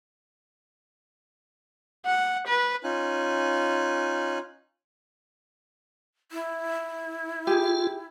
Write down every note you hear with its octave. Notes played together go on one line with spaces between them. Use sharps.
F#5
B4
C#4 D#4 F4 G#5 F#6
E4
F4 G4 G#4